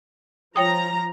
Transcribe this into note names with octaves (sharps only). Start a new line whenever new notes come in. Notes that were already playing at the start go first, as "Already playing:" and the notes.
F3 C#5 G5 A#5 D#6